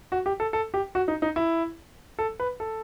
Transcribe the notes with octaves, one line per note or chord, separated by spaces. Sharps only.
F#4
G4
A4
A4
G4
F#4
D#4
D#4
E4
A4
B4
A4